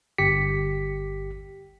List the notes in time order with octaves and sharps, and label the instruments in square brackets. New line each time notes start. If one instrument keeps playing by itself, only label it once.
[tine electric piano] G1 G4 B6 C#7